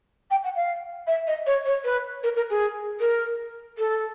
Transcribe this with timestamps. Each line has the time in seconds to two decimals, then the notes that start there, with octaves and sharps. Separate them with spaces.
0.30 G5
0.43 F#5
0.55 F5
1.07 E5
1.27 D#5
1.46 C#5
1.65 C#5
1.84 B4
2.23 A#4
2.36 A#4
2.49 G#4
3.00 A#4
3.78 A4